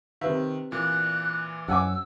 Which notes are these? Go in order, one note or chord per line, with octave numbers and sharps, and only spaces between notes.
C3 D#3 B4 E5
A#2 E3 F#6
F#2 F#5 G#5 D6 E6